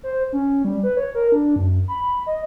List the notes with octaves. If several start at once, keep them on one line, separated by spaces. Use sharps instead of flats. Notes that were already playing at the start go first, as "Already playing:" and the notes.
C5
C#4
G3
B4
C#5
A#4
D4
F#2
B5
D#5